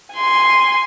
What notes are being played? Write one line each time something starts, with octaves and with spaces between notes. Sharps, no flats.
G#5 C6